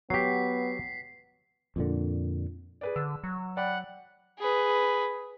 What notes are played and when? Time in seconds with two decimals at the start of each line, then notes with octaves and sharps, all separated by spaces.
0.10 F#3 B3 G4 B6 C7
1.76 F2 A#2 D3
2.81 G#4 B4 D5
2.96 D3 E6
3.24 F#3
3.57 D5 F#5 G5 B5
4.39 G#4 B4